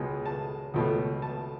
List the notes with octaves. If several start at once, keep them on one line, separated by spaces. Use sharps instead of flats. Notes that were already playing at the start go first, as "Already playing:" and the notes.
Already playing: C#2 B2 G#3
A5
C#2 B2 A3
A5